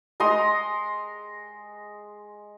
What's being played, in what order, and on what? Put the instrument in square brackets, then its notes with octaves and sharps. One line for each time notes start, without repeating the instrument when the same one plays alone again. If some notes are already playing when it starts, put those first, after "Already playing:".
[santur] G#3 A#5 C6 D#6